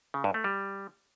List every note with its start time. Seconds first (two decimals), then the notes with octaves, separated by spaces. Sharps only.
0.14 C#3
0.24 G2
0.34 A3
0.44 G3